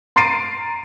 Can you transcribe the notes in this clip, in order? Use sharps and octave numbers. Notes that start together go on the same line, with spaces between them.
A#5 C6 A6 C7 D7 D#7